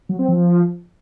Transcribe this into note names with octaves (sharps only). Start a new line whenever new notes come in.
F#3
C4
F3